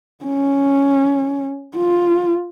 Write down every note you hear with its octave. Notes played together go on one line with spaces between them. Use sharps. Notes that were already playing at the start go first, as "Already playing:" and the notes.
C#4
F4